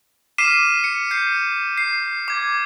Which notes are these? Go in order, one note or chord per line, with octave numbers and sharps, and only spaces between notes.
D6 F6 B6 C7 D#7 E7
C#7
G6 C7 C#7
C7
D6 G#6